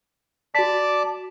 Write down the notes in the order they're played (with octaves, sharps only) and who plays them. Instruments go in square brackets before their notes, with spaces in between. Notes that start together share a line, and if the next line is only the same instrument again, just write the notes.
[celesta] F#4 B6 [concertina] D5 A5 D6